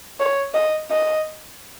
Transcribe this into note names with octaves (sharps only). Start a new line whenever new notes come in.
C#5
D#5
D#5